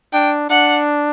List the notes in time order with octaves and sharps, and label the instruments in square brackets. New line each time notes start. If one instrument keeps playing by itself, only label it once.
[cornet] D4 [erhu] G5
[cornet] D4 [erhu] F#5